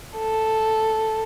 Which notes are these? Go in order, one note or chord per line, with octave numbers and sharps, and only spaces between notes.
A4